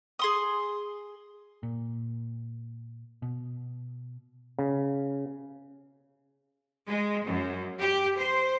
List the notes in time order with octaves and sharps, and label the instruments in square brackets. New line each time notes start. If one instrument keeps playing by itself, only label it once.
[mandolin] G#4 C6 D#6
[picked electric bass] A#2
B2
[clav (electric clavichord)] C#3
[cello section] G#3
F#2
G4
C5